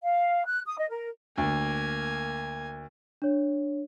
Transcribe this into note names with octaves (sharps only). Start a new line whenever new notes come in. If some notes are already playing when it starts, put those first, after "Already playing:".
F5
F#6
D#6
D#5
A#4
D2 A#3 G#5
D4 C#5